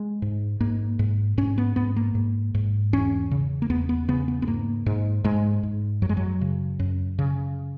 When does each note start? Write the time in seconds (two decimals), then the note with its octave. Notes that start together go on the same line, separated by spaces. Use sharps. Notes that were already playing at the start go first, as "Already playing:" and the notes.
Already playing: G#3
0.22 G#2
0.60 G#2 A#3
0.99 G#2
1.37 G#2 C#4
1.58 B3
1.76 G#2 B3
1.96 A#3
2.15 G#2
2.55 G#2
2.93 E2 C#4
3.31 C#3
3.62 A#3
3.70 E2 B3
3.89 B3
4.08 C#3 B3
4.28 B3
4.42 B3
4.47 G#2 A#3
4.86 G#2
5.24 G#2 G#3
5.63 G#2
6.02 F#2 F#3
6.09 G#3
6.17 F#3
6.41 C#3
6.79 F#2
7.19 C#3